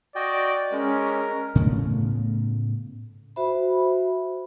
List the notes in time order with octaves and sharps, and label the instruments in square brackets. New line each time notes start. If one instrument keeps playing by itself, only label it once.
[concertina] F#4 D#5 G5 [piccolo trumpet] D5
[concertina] G#3 [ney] C#4 [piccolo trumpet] A#4
[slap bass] A2 C#3 A3 B3
[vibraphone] F#4 C5 E5 B5